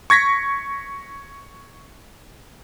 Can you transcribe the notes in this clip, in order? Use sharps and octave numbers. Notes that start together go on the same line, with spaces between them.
C#6 G#6 A#6 B6